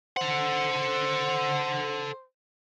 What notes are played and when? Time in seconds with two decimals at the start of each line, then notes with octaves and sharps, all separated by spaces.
0.17 A4 C5 F#5